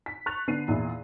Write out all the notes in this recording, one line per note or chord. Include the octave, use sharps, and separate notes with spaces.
B6
C#6 F#6 A6 F7
D3 B3 D4 C7 D#7
E2 A#2 E4